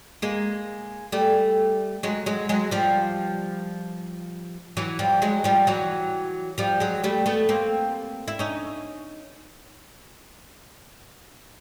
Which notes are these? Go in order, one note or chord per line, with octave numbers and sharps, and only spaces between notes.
G#3 A#3
G3 A3
F#3 G#3
F#3 G#3
F#3 G#3
F3 G3
E3 F#3
F3 G3
F#3 G#3
F3 G3
E3 F#3
F3 G3
F#3 G#3
G3 A3
A3 B3
A#3 C4
E4
C#4 D#4